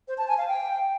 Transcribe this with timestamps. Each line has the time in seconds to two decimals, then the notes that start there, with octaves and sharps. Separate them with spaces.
0.08 C5
0.18 A5
0.28 G#5
0.38 F5
0.48 G5